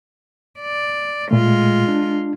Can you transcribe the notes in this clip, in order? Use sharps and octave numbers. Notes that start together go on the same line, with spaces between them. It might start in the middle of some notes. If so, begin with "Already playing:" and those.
D5
A#2 G#3 A3 F4
D4